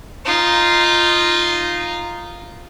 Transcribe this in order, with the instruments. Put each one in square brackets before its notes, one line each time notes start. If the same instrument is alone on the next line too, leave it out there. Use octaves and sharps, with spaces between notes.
[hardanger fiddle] D#4 F4